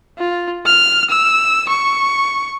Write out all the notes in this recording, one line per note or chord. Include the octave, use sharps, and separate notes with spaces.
F4
F6
E6
C#6